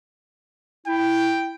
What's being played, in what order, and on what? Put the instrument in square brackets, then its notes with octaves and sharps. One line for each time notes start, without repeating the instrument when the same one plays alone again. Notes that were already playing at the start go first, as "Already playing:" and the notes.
[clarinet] E4 [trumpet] G5